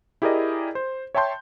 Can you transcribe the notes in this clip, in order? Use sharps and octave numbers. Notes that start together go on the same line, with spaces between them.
E4 G4 G#4 A#4 D5 D#5
C5
C#5 E5 G5 A5 C6 G6